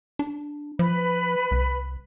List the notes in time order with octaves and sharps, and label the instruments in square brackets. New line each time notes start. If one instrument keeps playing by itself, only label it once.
[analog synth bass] D4
[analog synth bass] F3 [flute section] B4 B5
[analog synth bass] C2